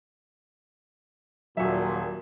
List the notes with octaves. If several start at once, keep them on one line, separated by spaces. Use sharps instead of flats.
D#1 A#2 F#3 F#4 E5